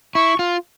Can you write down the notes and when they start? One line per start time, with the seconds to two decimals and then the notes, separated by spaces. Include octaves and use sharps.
0.15 E4 C#6
0.39 F4